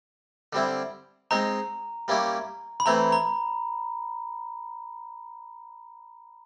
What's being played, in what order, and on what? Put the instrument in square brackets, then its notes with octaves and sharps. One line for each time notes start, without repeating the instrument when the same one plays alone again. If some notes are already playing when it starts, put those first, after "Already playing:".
[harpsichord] D3 G3 C4 E4
[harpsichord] G#3 C4 D#4 [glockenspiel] A#5
[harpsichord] G3 A#3 C#4 E4 G4
[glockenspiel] B5
[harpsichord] E3 A3 C4 E4 [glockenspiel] A#5
[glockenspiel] A#5